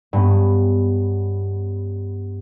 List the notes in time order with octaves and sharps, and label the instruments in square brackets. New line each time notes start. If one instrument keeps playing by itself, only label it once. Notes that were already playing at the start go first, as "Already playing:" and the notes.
[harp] G2 B3 C#4